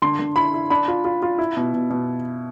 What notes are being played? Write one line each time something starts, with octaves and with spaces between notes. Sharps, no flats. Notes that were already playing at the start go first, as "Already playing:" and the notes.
D3 C6
D3
E4 B5
E4
D4 B5
F4
F4
F4
E4
B2
B2
B2